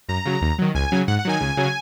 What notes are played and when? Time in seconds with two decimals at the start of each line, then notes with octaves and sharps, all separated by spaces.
0.09 F#2 A#5
0.25 C#3 F#3
0.42 D#2
0.59 D#3 F#3
0.75 C#2 G#5
0.92 C#3 F#3
1.08 G#2 F#5
1.19 F#5
1.25 D#3 F#3 G#5
1.41 C#2
1.57 C#3 F#3